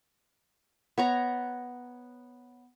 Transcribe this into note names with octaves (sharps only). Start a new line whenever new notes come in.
B3 C#5 A#5